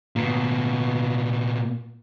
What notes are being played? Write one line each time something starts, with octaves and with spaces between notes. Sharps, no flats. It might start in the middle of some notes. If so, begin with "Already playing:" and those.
A#2 B3